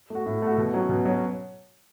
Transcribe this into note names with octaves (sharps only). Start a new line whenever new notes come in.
A3 F#4
A2
A3 F#4
B2
F#3 C#4
B2
F#3 C#4